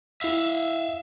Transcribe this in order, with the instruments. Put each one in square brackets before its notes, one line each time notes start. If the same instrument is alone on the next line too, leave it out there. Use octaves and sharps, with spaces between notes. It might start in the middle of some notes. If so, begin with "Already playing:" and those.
[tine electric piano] E4 E6 [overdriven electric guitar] E5 F5